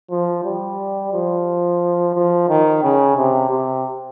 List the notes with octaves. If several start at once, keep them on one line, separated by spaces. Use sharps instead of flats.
F3
G3
F3
F3
D#3
C#3
C3
C3